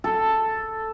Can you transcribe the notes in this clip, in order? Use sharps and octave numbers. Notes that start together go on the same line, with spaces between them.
A4